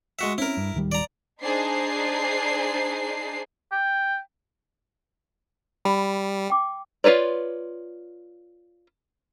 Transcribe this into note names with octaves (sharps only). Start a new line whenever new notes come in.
G#3 F#4 E5
C4 C#4 E4 A#4
G2
D1 D#3 G3
D5 A#5
D4 D#4 G#4 C5 C7
G5
G3 B5
G5 D6
F4 F#4 B4 C#5 D5